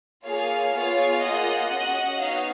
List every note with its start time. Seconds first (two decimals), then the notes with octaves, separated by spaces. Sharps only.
0.24 A#3 F4 G#4 C#5 F5
0.74 B3 F4 G#4 C#5 F5
1.22 A#3 F4 G#4 D#5 F#5
1.72 C#4 F#4
2.20 B3 D#4 F#4 C#5 F5